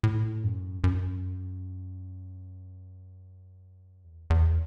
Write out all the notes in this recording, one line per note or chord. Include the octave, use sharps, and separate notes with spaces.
A2
F#2
F#2
E2
E2